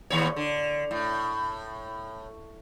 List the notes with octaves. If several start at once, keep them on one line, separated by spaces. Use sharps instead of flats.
D#2 A2 C#5
D3
A2